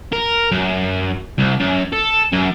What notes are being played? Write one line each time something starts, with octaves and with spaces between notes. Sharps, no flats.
A#4
F#2
C2
F#2
A4
F#2